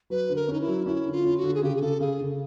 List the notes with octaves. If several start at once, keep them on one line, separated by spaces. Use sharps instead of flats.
F#3 B4
D3
A#4
C#4 D#4
E4
F#3
C#4 E4
D3
F4
C#4
F#4
D3
G#4
C#3 G4
G#4
C#3 A4
C#3 G#4
C#3